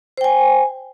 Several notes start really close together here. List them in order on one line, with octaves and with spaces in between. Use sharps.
C5 G5 G#5